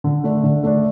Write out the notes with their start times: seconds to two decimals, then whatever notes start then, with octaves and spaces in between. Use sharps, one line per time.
0.04 D3
0.24 A3 D4
0.43 D3
0.63 A3 D4